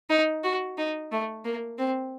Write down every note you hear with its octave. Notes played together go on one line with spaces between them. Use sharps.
D#4
F#4
D#4
A3
A#3
C4